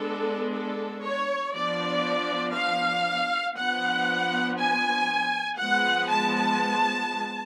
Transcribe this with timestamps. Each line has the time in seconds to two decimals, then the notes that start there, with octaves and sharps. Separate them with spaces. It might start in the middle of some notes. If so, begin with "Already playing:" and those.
Already playing: G#3 B3 D4 A4
0.54 A4
1.05 C#5
1.55 F3 B3 D4 D5
2.56 F5
3.57 F3 B3 D4 F#5
4.59 G#5
5.60 F3 G#3 B3 F#5
6.11 A5